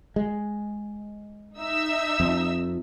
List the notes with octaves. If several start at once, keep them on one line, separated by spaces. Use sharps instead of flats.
G#3
D#4 E5 E6
F2